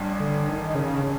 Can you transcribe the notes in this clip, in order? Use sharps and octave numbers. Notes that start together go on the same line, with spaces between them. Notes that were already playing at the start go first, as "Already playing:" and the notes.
Already playing: A1 G2
D3
D#3
C#3
C#3